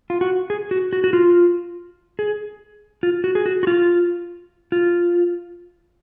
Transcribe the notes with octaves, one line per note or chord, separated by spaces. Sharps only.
F4
F#4
G#4
F#4
F#4
F#4
F4
G#4
F4
F#4
G#4
F#4
F#4
F4
F4